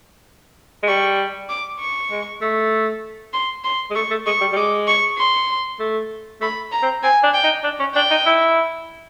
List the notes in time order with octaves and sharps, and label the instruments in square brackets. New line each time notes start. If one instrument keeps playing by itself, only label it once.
[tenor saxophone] G#3
[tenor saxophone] G3 [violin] C#6
[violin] D6
C#6
[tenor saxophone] G#3
A3
[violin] C6
C6
[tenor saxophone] G#3
[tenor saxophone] A3 [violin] C#6
[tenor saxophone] A3
[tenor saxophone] G#3 [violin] C#6
[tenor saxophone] G3
G3
[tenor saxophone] G#3 [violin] D6
[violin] C#6
C6
[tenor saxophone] A3
[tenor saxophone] A3 [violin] B5
[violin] A#5
[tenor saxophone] C4
[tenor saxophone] C4 [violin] G#5
[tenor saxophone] D4
[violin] G5
[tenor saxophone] D#4
D4
C#4
[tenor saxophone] D4 [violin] G5
[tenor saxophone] D#4
E4